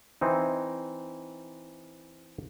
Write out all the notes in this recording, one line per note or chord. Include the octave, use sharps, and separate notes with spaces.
E3 C4 D#4